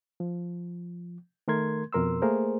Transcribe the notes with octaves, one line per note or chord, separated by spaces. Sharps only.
F3
D#3 A3 A#4 C6 G#6
F2 B2 A#4 C6 E6
A3 A#3 G#4 A#4 C5